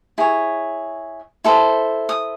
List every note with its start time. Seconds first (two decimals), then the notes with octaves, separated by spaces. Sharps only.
0.18 E4 G#4 C#5
1.44 E4 A4 C5
2.09 D#6